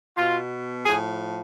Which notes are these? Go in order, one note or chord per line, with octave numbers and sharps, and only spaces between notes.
B2 F4
A2 F3 G#4